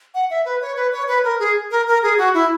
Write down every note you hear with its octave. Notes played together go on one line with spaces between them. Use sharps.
F#5
E5
B4
C#5
B4
C#5
B4
A#4
G#4
A#4
A#4
G#4
F#4
E4